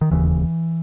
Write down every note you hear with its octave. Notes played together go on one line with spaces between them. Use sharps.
D#3
E1 D#2 C#3 E3